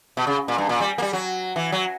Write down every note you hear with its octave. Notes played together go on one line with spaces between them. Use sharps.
B2
C#3
A#2
G2
A#2
G3
A#3
G3
F#3
E3
F#3